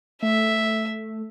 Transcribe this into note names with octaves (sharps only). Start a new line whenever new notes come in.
A3 E5